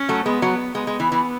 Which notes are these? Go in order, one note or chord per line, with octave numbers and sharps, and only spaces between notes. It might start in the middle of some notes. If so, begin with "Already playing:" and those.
Already playing: C#4
F#3 A3
G#3 B3
F#3
G#3 B3
G#3
E3
E3